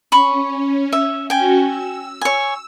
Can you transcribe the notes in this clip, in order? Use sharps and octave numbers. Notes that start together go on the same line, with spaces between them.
C#4 B5 C#6
E5
C#4 F#4 G5 G#5
E6
C#5 G#5